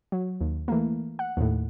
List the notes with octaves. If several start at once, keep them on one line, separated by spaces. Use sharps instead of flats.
F#3
D#2
E3 A3 A#3
F#5
D#2 A2